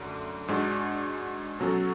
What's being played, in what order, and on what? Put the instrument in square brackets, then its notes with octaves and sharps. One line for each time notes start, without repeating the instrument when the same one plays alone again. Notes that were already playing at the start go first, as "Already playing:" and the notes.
Already playing: [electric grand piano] F#2 D3 A3
G#2 G#3 D4 F#4
B2 F#3 C#4 F#4 A4